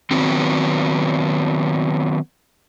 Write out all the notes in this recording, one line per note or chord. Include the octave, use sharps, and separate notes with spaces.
D#3 F#3 B3 C4